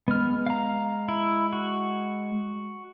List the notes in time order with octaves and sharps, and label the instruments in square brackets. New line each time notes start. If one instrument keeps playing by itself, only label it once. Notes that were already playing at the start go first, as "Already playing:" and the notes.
[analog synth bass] G#3 [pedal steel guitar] B3 F6
[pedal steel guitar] F5 A#5
E4
F#4